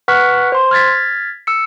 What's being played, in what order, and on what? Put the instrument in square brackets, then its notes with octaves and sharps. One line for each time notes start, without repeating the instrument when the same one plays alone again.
[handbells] B4 F#5 C#6 F6 F#6 B6
C5 C6
F6 G#6 A6 B6
E6 C#7